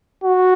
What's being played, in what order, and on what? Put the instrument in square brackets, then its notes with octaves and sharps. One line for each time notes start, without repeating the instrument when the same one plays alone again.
[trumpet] F#4